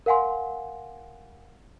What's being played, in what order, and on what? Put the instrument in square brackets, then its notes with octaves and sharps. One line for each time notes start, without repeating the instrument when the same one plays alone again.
[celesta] A#4 F5 F#5 G#5 C6